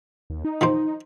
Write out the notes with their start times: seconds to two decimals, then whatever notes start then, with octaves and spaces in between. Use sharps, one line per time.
0.30 D#2
0.45 D#4
0.61 D#3 F3 C5